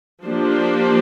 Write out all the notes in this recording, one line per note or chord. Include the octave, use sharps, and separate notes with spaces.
F3 A#3 D4 G4 C5